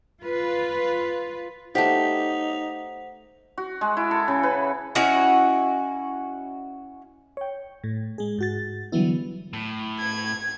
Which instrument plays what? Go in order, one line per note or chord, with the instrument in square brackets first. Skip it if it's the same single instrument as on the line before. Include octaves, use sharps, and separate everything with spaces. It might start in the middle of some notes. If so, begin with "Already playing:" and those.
[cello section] F4 B4
[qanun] A3 G4 [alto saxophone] D#4 [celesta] C5 F#5 B6
[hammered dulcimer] F#4
G#3
E4
A4
C#3
B4
[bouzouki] C#4 E4 F#4 D#5
[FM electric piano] C#5 G5
A2
G#3 G#4
G#2 F#4 A6
D3 E3 F#3 G3 B3 E4
[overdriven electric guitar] A2
[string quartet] G#6